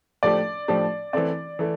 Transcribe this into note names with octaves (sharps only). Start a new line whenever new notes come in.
A2 F3 A3 D4 G4 D5
A2 F3 A3 D4 G4
E3 A3 C4 D5
E3 A3